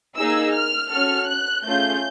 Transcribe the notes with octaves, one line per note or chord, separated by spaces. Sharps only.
A#3 D#4 G#4 E6
F6
C#4 F#4 A4 F6
F#6
A3 C#4 F4 G#4 G6